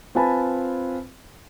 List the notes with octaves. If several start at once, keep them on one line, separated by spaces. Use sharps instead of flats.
C4 F4 B4 G#5 A5 B5